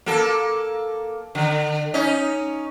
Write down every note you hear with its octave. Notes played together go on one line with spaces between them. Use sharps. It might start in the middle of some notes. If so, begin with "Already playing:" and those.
A#3 A4
D3
C#4 D#4